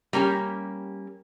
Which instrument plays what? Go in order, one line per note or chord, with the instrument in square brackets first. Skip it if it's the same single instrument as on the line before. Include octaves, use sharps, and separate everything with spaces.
[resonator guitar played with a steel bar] G3 A#3 C#4 G4